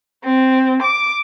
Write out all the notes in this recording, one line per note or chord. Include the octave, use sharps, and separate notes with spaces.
C4
D6